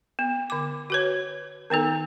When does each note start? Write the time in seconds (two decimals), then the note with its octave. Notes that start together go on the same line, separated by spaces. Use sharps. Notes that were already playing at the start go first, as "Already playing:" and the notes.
0.19 B3
0.50 D3 D6
0.90 F#4 B4 C#5
1.70 D#3 B3 D#4 A4